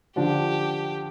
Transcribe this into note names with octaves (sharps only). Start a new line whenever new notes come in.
D3 F3 D4 G4